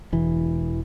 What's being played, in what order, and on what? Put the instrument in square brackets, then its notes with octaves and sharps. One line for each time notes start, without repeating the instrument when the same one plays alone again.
[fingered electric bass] E1 E3